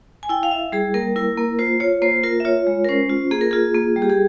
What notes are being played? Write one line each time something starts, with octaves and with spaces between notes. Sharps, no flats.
G#5
E4 G5
F5
E4 E5
G3 G#4
A#3 A#4
E4 A#4
A#3
F4 C5
F4 C#5
A#3 C5
F4 A#4
E5
F4 C#5
G#3
A#4
C#4 C5
F4
A#3 G#4
A#4
F4 G#4
A#3
G3
G4
G#4